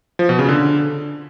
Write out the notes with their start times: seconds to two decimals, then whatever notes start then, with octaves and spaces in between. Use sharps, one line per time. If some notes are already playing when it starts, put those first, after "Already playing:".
0.19 F3
0.29 B2
0.39 C#3
0.49 D3